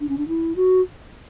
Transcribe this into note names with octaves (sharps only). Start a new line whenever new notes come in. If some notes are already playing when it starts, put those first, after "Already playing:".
D4
C#4
D4
E4
F#4